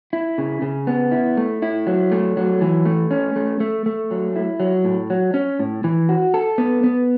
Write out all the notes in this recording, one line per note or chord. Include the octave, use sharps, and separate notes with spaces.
E4
C#3
C#3
B3
E4
A3
E4
F#3
A3
F#3
E3
A3
C#4
A3
A3
A3
F#3
E4
F#3
A2
F#3
C#4
A2
E3
F#4
A4
B3
B3